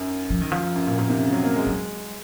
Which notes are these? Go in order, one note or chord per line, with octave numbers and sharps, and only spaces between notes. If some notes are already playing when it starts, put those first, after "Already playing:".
Already playing: F#2 D#3
F3
D#3
F3
F#2
A#2
A#2
C3
C#3
F#3
A#3
G#3
F#3